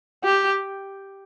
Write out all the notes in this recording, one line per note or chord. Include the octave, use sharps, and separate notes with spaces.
G4